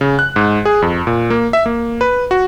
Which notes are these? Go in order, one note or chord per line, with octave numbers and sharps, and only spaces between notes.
C#3
F#6
G#2
G#4
F2
A#2
A#3
E5
A#3
B4
F#4